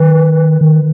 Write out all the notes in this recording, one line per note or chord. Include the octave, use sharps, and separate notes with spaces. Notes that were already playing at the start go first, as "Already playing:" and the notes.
Already playing: D#3 B4
D#3